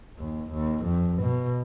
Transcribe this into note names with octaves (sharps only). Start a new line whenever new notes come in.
D#2
D#2
F2
B2